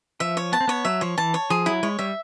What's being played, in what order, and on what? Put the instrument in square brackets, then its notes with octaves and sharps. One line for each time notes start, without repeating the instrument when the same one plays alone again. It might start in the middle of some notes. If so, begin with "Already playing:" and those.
[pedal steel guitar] F3 [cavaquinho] E5
[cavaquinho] C#5
[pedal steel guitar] B3 [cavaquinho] A5
[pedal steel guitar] C4
[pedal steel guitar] B3 [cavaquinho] C#5
[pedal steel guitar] F#3 [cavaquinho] E5
[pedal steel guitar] F3 [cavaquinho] C#5
[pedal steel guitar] E3 [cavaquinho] A5
[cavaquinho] C#5
[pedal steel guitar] F3 [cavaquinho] G#4
[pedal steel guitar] F#3 [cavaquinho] E4
[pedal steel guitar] G#3 [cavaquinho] C#5
[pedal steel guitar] G3 [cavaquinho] E5